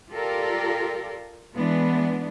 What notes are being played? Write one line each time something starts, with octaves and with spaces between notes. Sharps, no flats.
F4 G4 A4 A#4 D5
E3 G#3 B3 D4